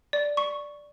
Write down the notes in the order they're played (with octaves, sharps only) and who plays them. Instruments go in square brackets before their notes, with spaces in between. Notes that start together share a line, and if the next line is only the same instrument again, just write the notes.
[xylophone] D5
C#6